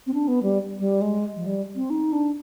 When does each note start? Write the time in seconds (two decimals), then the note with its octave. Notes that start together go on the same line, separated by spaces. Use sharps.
0.07 C4
0.14 D4
0.28 B3
0.43 G3
0.79 G3
1.01 G#3
1.36 F3
1.46 G3
1.76 C4
1.90 D#4
2.12 D4